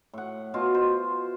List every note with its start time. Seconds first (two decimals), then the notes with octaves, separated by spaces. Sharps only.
0.13 A2 F#5
0.54 B2 F4 F#4
0.75 C5